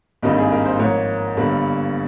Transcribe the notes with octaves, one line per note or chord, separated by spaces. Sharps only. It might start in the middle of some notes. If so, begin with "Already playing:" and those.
G#1 G2 D#3 A#3 D#5
G#4
A#4
C5
G#2 F3 A#3 C#5
G1 G2 G3 A#3